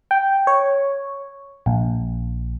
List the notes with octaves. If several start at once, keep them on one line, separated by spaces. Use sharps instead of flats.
G5
C#5
A#1